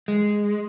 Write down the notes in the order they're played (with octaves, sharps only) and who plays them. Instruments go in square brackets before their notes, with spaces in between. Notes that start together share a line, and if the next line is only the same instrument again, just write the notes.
[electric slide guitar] G#3